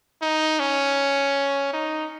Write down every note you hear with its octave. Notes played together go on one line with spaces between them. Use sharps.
D#4
C#4
D#4